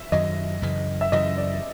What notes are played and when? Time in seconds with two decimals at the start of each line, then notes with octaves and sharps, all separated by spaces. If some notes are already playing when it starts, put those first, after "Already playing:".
Already playing: E5
0.12 F#2 D#3 F#3 D#5
0.62 F#2 C#3 E3
1.01 E5
1.12 F#2 C#3 E3 D#5
1.37 D5